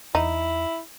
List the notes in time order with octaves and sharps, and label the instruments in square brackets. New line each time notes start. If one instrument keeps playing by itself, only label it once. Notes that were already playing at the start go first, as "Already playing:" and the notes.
[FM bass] E2 [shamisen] D#4 [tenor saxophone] E4